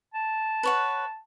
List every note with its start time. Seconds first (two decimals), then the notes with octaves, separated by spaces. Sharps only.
0.14 A5
0.63 B4 C#5 F#5